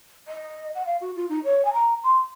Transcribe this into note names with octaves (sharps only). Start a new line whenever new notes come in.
D#5
F#5
F5
F#4
F4
D#4
C#5
G#5
A#5
C6